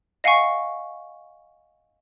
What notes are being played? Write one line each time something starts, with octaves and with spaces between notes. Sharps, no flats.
D#5 F5 F#5 G#5 C#6